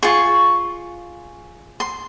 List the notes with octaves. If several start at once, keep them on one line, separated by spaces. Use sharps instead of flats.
F4 G#4 C#6
C6